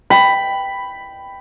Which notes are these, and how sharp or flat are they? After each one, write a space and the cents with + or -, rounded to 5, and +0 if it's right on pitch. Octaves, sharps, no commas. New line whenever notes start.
G5 +0 B5 +5